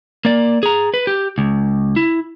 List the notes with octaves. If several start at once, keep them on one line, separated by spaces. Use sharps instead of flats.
A#3 D5
G#4 A#5
B4
G4
C#2
E4